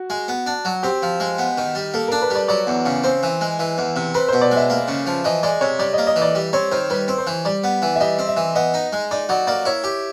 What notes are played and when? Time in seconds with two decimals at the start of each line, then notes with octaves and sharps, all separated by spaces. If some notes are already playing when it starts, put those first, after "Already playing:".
Already playing: F#4
0.10 G#3
0.28 B3
0.46 D4
0.65 F#3
0.83 C4 G4
1.02 F3
1.20 G#3
1.38 B3
1.58 D#3
1.75 G3
1.94 A#3 A4
2.08 D4 A#4
2.22 B4
2.30 G3
2.35 D5
2.48 F#3 D5
2.67 E2
2.85 C#3
3.04 C4 C5
3.23 E3
3.41 G#3
3.59 E3
3.78 E2
3.96 C3
4.14 C4 B4
4.28 B2 C5
4.41 D5
4.51 G#3 E5
4.70 A#3
4.88 C#3
5.06 F3
5.24 E3 D#5
5.43 G#3 D5
5.61 C3 C#5
5.79 G3 D5
5.93 D#5
5.98 A#3
6.07 D#5
6.16 E3
6.22 D5
6.35 G3
6.53 C4 C#5
6.71 D#3 C5
6.90 G3 B4
7.08 C4
7.18 C5
7.27 E3
7.45 G3 D5
7.64 B3
7.82 E3
7.96 E5
8.00 G3 D#5
8.19 C4
8.28 E5
8.37 E3
8.55 B3 D#5
8.74 D#4
8.93 G#3
9.11 D#4 D5
9.29 F#3 D5
9.47 A#3 D5
9.65 E4 C#5
9.84 G4